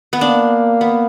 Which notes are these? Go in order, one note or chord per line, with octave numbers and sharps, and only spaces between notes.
B3
A#3 D4
B3